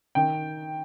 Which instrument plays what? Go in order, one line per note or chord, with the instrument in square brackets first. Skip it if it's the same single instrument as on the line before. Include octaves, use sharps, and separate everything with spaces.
[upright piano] D#3 G5